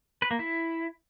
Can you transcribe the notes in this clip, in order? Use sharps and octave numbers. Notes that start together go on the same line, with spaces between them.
B4
A#3
E4